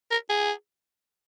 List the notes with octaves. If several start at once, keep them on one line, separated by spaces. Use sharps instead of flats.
A#4
G#4